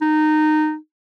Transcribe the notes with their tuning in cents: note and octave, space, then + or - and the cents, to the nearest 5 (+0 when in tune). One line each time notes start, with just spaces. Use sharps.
D#4 -15